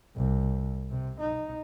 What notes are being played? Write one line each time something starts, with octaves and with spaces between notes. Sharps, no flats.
C2
C3
D#4